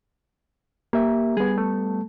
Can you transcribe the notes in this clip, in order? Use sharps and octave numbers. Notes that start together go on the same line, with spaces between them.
A#3 G4 E5
G3 B3 G#4
A3